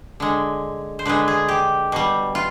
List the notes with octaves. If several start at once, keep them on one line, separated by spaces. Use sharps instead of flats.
D3 G#3
C5
D3 G#3 B4
G#4
G4
B2 G3
F4